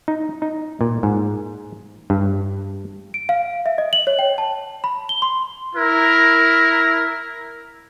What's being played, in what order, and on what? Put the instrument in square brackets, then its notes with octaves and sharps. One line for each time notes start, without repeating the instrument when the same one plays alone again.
[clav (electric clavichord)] D#4
D#4
A#2
G#2
G2
[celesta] D7
F5
E5
D#5
F#7
C#5
G5
A5
B5
G7
C6
[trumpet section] E4 A#4